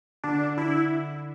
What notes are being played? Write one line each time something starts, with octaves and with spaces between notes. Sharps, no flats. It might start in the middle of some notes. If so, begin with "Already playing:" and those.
D3 D4
D3 E4